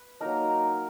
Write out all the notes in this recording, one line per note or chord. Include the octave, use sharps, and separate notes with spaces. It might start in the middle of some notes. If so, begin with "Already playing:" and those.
Already playing: B4
F#3 A#3 D#4 A#4 A#5